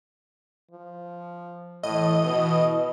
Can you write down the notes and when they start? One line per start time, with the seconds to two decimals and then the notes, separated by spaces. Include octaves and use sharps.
0.71 F3
1.83 A2 E3 D#5
2.24 B2